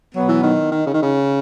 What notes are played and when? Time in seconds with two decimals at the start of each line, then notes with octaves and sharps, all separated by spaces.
0.13 B2 F#3 B3
0.28 E3
0.43 D#3
0.71 D#3
0.87 C#3
0.94 D#3
1.02 C#3